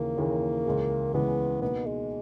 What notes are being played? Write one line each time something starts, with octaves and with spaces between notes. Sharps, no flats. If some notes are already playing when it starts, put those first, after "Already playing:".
Already playing: D#2 C#3 E3 A#3
D#2 C#3 E3
C#2 C#3 E3 G#3
C#2 C#3 E3 G#3 B3
B2 A#3 B3 D#4 F#4
G#3